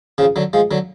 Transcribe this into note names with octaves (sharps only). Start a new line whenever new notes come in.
C#3 F3
D3 F#3
F3 G#3
D3 F#3